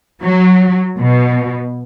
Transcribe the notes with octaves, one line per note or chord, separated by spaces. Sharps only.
F#3
B2